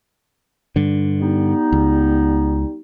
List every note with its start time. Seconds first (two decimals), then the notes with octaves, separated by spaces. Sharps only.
0.76 G2 D3
1.21 G3 B3 D#4
1.73 C#2